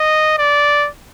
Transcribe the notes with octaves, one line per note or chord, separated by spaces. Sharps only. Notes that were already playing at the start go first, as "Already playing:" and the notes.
Already playing: D#5
D5